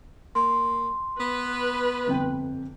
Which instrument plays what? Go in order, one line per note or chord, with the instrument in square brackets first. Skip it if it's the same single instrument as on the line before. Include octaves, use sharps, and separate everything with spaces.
[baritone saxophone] A#3 [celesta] C6
[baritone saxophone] B3 [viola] B4
[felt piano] G1 F2 G5